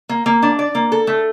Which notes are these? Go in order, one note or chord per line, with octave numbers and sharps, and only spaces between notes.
A#3
A#3
D4
D5
A#3
A4
A3